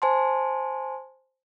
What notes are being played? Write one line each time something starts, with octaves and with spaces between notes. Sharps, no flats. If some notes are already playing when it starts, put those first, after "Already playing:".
C5 G#5 A5 C6